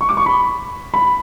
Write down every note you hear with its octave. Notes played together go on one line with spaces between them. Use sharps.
C#6
D6
C#6
B5
B5